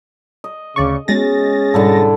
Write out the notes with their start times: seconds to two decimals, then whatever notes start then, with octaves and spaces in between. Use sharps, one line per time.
0.44 D#5
0.76 D2 C#3 D5 C#6
1.08 G#3 B3 C#4 F#4 G#4 A6 A#6
1.74 G#2 B2 D3 G3 E4 A4